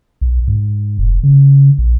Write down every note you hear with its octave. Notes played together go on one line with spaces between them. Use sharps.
B1
G#2
F1
C#3
A#1